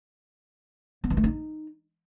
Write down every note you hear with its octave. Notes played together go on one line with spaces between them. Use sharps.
B3
E3
A3
D#4